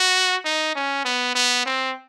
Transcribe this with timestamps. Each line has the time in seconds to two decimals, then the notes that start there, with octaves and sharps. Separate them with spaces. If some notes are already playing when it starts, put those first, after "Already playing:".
Already playing: F#4
0.45 D#4
0.76 C#4
1.05 B3
1.35 B3
1.66 C4